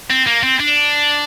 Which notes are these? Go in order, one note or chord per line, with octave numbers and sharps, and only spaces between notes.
C4
A#3
C4
D4